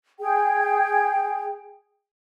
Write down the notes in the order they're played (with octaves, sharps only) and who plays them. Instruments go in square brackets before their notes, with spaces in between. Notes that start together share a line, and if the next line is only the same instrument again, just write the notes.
[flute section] G#4 G5